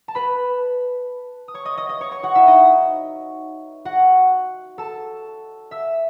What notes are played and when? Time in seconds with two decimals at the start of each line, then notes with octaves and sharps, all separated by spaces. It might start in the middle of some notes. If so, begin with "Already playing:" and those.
0.08 A5
0.15 B4 B5
1.48 D#6
1.54 C#5 C#6
1.65 D#5 D#6
1.77 D#5 D#6
1.89 D#5 D#6
2.01 C#5 C#6
2.11 C#5 C#6
2.23 F#4 F#5
2.35 E4 E5
2.47 D#4 D#5
3.85 F#4 F#5
4.78 A4 A5
5.71 E5 E6